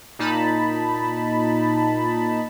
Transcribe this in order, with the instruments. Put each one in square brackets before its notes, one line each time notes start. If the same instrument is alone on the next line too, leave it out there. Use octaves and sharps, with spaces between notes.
[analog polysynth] A#2 D#4 A5 B5